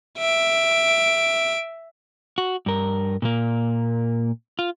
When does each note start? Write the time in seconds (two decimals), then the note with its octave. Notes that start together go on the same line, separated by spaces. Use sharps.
0.18 E5 D7
2.38 F#4
2.66 G2 A#4
3.22 A#2 A#3
4.59 F4